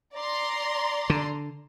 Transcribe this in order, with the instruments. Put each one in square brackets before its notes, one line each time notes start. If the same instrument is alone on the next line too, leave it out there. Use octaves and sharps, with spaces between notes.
[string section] D5 A#5 C6
[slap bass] D3